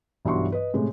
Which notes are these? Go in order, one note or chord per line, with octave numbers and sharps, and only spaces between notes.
B1 G2 E3 F#4 C6 C#6
B4 D#5
A2 C3 G#3